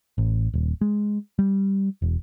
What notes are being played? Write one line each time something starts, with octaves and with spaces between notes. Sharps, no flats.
A1
D#1
G#3
G3
E1